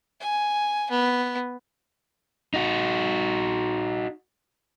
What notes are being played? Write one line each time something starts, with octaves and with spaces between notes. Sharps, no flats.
G#5
B3
D#4 F#4